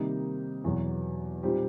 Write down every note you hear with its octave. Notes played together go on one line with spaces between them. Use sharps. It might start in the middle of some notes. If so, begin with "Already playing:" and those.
Already playing: C3 D#3 G3 A#3 D#4
E2 B2 F#3
A#2 G3 C4 D#4 G4